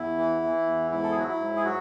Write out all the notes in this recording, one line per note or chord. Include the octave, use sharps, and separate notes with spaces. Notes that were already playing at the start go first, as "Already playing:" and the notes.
Already playing: E2 E4
E3
E3
E2
G#2 E4
A4
G#4
F#3 F#4
E4
G#2
G#4
F#3 F#4